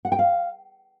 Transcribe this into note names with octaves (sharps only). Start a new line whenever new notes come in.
F#5
G5
F5